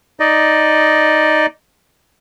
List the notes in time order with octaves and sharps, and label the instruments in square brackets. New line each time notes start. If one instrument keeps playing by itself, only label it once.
[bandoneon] D#4 D5 D#5